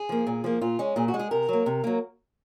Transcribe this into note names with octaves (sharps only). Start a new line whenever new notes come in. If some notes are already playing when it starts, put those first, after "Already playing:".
Already playing: G#4
F3 A#3
A#2
F3 A#3
A#2 F4
G#3 C#4
A#2 G#4
F#4
G#3
G#4
C3 A#4
F#3 A#3
C3
F#3 A#3